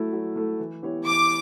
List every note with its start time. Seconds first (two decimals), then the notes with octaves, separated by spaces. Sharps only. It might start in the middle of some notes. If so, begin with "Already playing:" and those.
Already playing: F#3 A3 E4 A4
0.13 F#3
0.36 A3 E4 A4
0.60 E3
0.83 B3 E4 G4 C#5
1.05 E3 D6